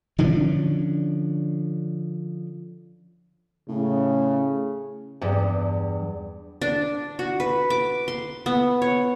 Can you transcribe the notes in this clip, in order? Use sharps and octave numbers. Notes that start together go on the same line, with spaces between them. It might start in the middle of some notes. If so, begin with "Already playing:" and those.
D3 F3 C#4 D4
A2 C#3
E2 G2
D4
F#4
B4
D6
C6
B3
C#5